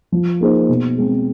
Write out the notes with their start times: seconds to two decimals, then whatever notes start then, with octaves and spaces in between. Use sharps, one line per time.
0.12 F3
0.40 A#3 D#4 G#4 C5
0.69 B2
0.98 G#3 C4